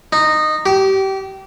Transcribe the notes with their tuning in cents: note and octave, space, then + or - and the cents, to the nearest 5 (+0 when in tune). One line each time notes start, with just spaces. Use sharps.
D#4 -15
G4 -25